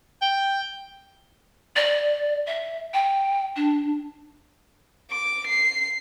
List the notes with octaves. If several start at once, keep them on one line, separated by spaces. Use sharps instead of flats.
G5
D5
E5
G5
D4
D6
C7